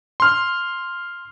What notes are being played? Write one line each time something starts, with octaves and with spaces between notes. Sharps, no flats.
C6 F6